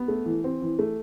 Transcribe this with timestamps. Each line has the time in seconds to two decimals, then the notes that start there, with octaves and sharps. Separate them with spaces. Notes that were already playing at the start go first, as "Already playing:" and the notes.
Already playing: B3
0.08 A3
0.26 E3
0.44 C4
0.62 E3
0.79 A3